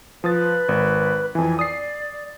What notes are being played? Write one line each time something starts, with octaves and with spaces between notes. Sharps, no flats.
F3 B4 D#6 A6
G#1
F2 E3 G#5
D5 D#6 C7